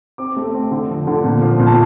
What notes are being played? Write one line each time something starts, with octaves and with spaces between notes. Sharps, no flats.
C4 D6
A3
C4
D3
F3
D3
A#2
F3
A#2
A5